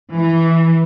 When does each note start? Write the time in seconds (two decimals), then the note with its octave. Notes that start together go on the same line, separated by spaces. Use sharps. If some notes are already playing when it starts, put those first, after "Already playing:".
0.12 E3